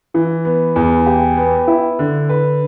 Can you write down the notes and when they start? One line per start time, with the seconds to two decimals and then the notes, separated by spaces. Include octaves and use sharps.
0.14 E3
0.45 B3
0.76 E2
1.06 G4
1.37 B3
1.67 E4
1.99 D3
2.29 B4